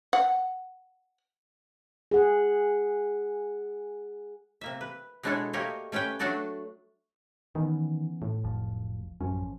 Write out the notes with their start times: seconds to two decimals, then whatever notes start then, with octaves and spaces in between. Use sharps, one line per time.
0.13 F#5
2.11 G#4 F#5
4.61 C3 A#3 E5
4.81 B4
5.23 B2 G#3 D4 E4 A4 C#5
5.53 A3 A#3 G4 C#5 D#5 F5
5.92 A3 C#4 G4 B4 G5
6.19 F#3 A3 D4 F#4 A4 D5
7.55 D#3 E3 B3 C#4
8.22 A2
8.43 F1 B1 F3
9.21 A1 F#2 F3 C#4